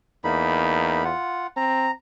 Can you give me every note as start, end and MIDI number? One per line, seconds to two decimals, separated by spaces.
0.24 1.11 40
0.24 1.04 58
0.24 1.04 63
0.24 1.04 83
1.04 1.47 65
1.04 1.47 78
1.56 1.90 60
1.56 1.91 82